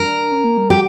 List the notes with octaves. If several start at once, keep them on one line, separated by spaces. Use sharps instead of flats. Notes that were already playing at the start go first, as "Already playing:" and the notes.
Already playing: D4 A#4
C#4
A#3
G3
G4